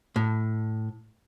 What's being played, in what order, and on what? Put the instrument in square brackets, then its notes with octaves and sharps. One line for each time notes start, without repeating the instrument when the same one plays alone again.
[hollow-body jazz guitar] A2